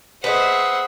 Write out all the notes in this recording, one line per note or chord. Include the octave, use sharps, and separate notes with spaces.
G#4 B4 C5 D#5 E5 F#5